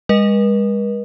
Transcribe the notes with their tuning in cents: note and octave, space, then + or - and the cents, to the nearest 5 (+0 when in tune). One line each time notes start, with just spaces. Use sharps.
G#3 -30 B4 -45 D#5 -5